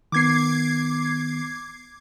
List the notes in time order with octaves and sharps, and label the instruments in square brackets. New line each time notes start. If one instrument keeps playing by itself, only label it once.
[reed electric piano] D#3 B3 [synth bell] D6 G#6 C7